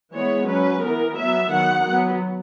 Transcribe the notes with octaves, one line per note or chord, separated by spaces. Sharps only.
E3 G#3 B3 C#5
F#3 C#4 B4
E3 B3 A#4
F#3 B3 E5
D#3 F#3 B3 F#5
F#3 B3